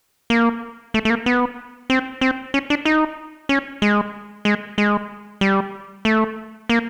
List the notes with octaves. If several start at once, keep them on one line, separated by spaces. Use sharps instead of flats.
A#3
A3
A3
A#3
B3
C4
C4
C#4
D4
D#4
C#4
G#3
G#3
G#3
G3
A3
A#3